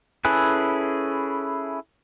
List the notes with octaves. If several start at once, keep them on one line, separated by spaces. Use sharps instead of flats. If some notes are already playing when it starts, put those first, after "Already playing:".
C#4 E4 G#4 A4 B4